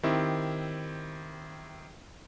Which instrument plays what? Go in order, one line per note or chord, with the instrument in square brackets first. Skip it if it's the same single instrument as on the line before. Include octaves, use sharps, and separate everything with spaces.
[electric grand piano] D#3 C4 E4 G4